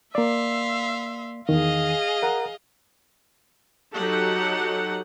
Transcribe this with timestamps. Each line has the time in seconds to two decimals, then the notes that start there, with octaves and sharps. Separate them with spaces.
0.15 A#3 D5 E5 F5 C6
1.49 E2 D#3 G#4 D#5 F5
2.22 A#4 F#5 A#5
3.93 F#3 D#4 G4 A4 F#5